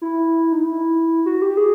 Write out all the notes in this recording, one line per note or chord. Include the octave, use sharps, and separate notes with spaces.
E4
D#4
E4
F#4
G4
G#4